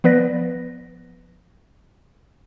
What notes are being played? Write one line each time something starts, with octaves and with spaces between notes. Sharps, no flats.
F3 B3 B4 D5 A#6